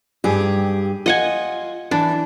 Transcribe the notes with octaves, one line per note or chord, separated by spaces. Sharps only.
G2 G4 G#4
F4 D#5 F#5 G#5
E3 D4